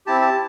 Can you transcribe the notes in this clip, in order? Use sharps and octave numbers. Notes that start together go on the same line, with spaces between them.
C4 E4 G4 A5
A5